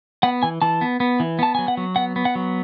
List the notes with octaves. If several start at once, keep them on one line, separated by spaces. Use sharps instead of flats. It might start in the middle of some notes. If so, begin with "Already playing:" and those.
B3 F#5
E3 G#5
E3 A5
B3
B3
E3
B3 A5
F#3 G#5
F#5
F#3
B3 F#5
B3
F#5
F#3